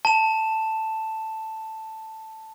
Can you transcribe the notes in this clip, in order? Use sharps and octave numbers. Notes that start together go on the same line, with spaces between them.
A5 E7